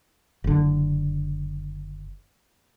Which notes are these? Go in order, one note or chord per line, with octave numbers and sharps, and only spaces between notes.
F#1 D3